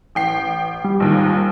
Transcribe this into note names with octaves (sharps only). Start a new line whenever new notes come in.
A1 G5 C7
G3
A#1 D#2 G#2